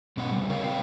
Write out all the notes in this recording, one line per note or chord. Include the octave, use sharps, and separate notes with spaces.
B2 B3 C#4 B4 F#5
C#3 G3
F#4 A#4 C#5 F5
C4 B4 C#5 F5 G5